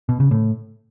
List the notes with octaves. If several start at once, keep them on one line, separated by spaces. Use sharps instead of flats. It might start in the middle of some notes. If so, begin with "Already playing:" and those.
B2
C#3
A2